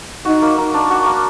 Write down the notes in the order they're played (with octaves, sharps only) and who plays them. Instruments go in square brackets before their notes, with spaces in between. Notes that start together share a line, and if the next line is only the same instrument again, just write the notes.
[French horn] D#4 [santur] F#4
[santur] A#3
A#4
D4
F#4
A#3